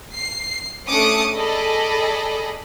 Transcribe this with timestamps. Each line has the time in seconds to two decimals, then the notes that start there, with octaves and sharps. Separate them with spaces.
0.13 C7
0.86 A3 C#4 D4 D6 D#6 C#7
1.34 G#4 A4 D5 D#5 B5